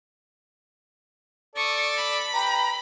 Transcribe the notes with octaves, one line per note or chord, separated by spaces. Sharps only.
A4 D5 C#6 D#6
B5
G4 B4 A#5